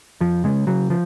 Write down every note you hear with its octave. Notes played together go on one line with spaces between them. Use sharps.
F2 F3
C#3 G#3
C#3 F#3
F3